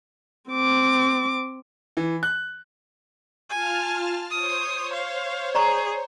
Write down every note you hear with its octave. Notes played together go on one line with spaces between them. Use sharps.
C4 D6
E3
F#6
F4 G#5 A5 F6
C5 C#5 D#6
F5
G#4 D5 A#5 C#6